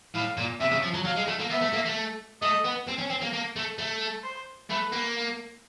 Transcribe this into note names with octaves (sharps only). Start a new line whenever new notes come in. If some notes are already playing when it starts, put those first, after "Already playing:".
A2 F5
A#2
C3 E5
C#3
F3
F#3
F#3 F5
G#3
A3
A#3
B3 E5
A3
A#3
A3
A3 D#5
B3
C4
C#4
C4
A#3
A#3
A3
A3
C5
A3 B4
A#3